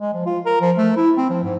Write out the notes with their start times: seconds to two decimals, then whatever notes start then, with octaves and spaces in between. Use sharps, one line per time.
0.01 G#3
0.14 F3
0.26 F4
0.46 A#4
0.61 F3
0.77 A3
0.96 E4
1.17 C4
1.29 F3
1.43 G#2